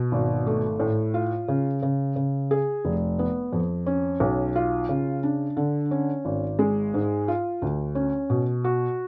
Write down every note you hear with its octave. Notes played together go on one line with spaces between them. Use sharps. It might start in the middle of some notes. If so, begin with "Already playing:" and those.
Already playing: B2
G#1
A3
A2
F4
C#3
C#3
C#3
G#4
F1
B3
F2
C#4
B1
F4
C#3
D4
D3
C#4
G#1
G#3
G#2
F4
D2
C#4
B2
F#4